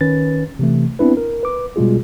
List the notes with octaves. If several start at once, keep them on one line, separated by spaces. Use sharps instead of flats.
D#3 C#4 B4 A6
C3 E3 A3
B3 C4 D4 E4 B4
A#4
B4 D6
B2 G3 G#3 F4 G#4